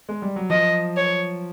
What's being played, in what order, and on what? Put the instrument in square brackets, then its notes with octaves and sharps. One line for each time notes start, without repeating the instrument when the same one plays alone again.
[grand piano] G#3
G3
F#3
[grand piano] F3 [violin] D#5
[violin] C#5